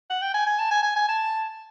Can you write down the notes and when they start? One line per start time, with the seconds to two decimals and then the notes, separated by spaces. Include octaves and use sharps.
0.10 F#5
0.22 G5
0.34 G#5
0.47 G#5
0.58 A5
0.71 G#5
0.83 G#5
0.96 G#5
1.08 A5